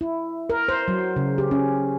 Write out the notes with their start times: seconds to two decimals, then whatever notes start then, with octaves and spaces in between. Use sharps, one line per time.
0.01 E4
0.50 A#4
0.69 C5
0.88 F#3
1.16 C#3
1.38 G4
1.51 C#4